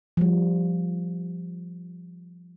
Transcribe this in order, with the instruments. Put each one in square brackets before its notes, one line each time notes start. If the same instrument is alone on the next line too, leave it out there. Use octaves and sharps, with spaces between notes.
[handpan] F3 G3